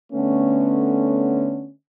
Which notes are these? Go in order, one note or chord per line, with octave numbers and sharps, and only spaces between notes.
D3 A3 B3 C#4